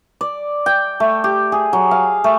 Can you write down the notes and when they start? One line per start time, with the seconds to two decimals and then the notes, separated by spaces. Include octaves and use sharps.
0.21 D5
0.66 G5
1.00 A3
1.24 G4
1.52 G#4
1.73 F#3
1.91 F5
2.24 A3